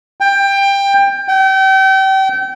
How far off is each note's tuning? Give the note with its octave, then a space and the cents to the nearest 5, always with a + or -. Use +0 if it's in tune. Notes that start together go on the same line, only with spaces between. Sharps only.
G5 +20
G5 -35